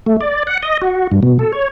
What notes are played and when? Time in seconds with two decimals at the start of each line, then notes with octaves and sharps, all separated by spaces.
0.06 A3
0.21 D5
0.47 F#5
0.63 D#5
0.82 F#4
1.12 G2
1.23 B2
1.39 A4
1.52 C#5